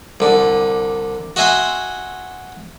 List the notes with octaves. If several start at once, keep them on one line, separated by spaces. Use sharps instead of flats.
C2 D3
F#4 D#5 E5 G#5 B5 C6